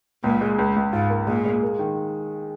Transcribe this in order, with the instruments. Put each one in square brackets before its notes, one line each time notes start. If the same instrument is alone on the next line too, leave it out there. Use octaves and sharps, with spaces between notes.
[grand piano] C#2 [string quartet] A#2
[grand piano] G#3
C#2
C#2
[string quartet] G#2 [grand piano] F4
[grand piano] A#3
[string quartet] A#2 [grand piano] G#3
[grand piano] G#3
A#3
D#3